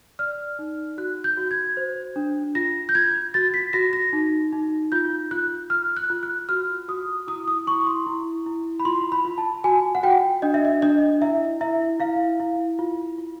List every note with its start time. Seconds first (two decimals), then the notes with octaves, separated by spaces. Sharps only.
0.19 D5 F6
0.59 D#4
0.98 F#4 F#6
1.24 G6
1.37 F#4
1.51 G#6
1.77 C5
2.16 D4
2.55 F4 A#6
2.89 G6
2.95 F4 G#6
3.34 F#4 A6
3.54 B6
3.73 F#4 A#6
3.93 A#6
4.13 D#4
4.53 D#4
4.92 F4 G6
5.31 F4 F#6
5.70 F4 F6
5.97 F#6
6.10 F4
6.23 F#6
6.49 F#4 F6
6.88 F#4 D#6
7.28 E4 D#6
7.48 D#6
7.67 E4 C#6
7.87 C6
8.06 E4
8.46 E4
8.80 B5
8.85 F4 C6
9.12 B5
9.25 F4
9.38 A5
9.64 F#4 G#5
9.95 F#5
10.03 F#4 G5
10.42 D4 D#5
10.54 E5
10.65 D#5
10.82 D4 D#5
11.22 E4 E5
11.61 E4 E5
12.00 E4 F5
12.40 E4
12.79 F4
13.18 F4